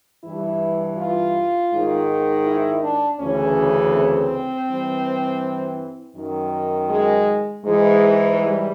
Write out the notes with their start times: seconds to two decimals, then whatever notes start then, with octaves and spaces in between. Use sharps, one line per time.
0.23 G2 E3 E4
0.98 F4
1.72 G#2 D#3
2.46 E4
2.83 D4
3.19 D2 C#3 E3 C#4
3.93 C4
4.67 G2 E3
6.15 F#2 D#3
6.90 G#3
7.63 G#2 E3 G#3
8.38 G3